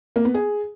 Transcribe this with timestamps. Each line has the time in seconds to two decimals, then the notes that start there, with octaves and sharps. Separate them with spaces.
0.16 A#3
0.25 B3
0.34 G#4